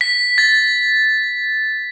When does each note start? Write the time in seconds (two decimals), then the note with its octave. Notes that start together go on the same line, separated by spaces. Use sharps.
0.01 B6
0.38 A6